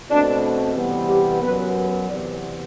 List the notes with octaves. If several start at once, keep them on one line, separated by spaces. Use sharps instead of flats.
B2 A3 C4 D4
C3 E3 G3 B3
G4
F#2 F#3 B3 B4
B4
C3 E3 B3 D5